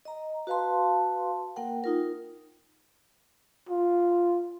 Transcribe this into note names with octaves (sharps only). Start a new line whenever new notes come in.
D#5 A#5
F#4 B4 F5 A5 C6
A#3 A#4 F#5 G5
D#4 F4 A#4
F4